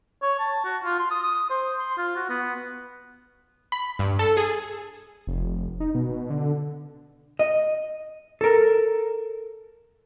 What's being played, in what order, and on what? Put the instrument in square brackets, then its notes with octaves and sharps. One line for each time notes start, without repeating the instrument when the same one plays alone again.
[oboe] C#5
A5
F#4
F4
C6
D#6
D#6
C5
C6
F4
F#4
B3
[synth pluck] B5
G2
A4
G#4
[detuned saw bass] F1
D#4
B2
D3
[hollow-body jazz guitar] D#5
A4 A#4